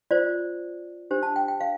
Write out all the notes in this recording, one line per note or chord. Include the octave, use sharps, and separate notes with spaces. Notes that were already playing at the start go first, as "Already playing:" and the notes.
F4 C5 D5
D4 G4 C5
A5
G5
G5
F5